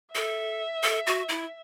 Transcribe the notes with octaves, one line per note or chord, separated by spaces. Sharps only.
A4 E5
A4
F#4
E4